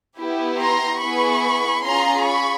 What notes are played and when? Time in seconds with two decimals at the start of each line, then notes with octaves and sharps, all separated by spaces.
0.18 B3 E4 G4
0.59 A#5 C6
1.01 B3 E4 G#4 B5 C#6
1.84 C#4 F4 G#4 A#5 C6
2.25 B5 C#6